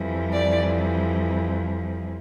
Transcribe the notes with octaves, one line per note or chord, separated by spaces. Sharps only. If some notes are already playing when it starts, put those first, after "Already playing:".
Already playing: F2 E3 G3
D5